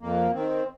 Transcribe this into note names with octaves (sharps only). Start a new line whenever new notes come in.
F2 A#3
D#3 C4